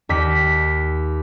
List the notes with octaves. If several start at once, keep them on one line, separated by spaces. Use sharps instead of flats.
D#2 B6